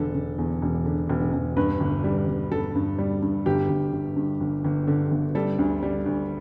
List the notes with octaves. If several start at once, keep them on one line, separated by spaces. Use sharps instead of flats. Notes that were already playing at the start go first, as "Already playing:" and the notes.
Already playing: E1 D3 A4
D3
E2
E1
D3
E1
E1
G2 B4
G1
G3
G1
G1 A4
G2
G3
G2
G1 G4
G1
G1
G2
G1
G1
D3
G1
G3 A4
D2
G3
D2